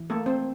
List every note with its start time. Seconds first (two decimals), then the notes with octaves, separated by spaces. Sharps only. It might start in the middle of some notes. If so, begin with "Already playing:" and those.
Already playing: E3
0.10 A3 A#3 A4
0.26 C4 C5